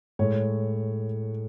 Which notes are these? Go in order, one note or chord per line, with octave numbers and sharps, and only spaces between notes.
A2 G#3 C#5